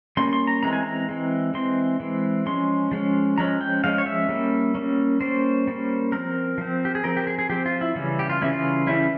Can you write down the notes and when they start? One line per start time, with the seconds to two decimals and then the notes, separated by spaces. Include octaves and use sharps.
0.17 G3 A#3 C#4 C6
0.33 C6
0.47 A#5
0.63 E3 G#3 C4 A#5
0.73 G#5
0.83 A#5
1.09 E3 G#3 C4
1.54 E3 G#3 C4 C6
2.00 E3 G#3 C4
2.46 F3 G#3 C#4 C6
2.92 F3 G#3 C#4
3.38 F3 G#3 C#4 A#5
3.61 G5
3.84 F3 G#3 C#4 F5
3.98 C#5
4.06 E5
4.29 G3 A#3 C#4
4.75 G3 A#3 C#4
5.21 G3 A#3 C#4 C5
5.67 G3 A#3 C#4
6.12 F3 C4 A#4
6.58 F3 C4
6.85 G4
6.95 G#4
7.04 F3 C4 A#4
7.17 G4
7.27 G#4
7.39 G#4
7.50 F3 C4 G4
7.66 F4
7.81 E4
7.95 C#3 E3 G3 C#4
8.19 G4
8.30 F4
8.42 C#3 E3 G3 C#4 E4
8.53 F4
8.87 C#3 E3 G3 C#4 E4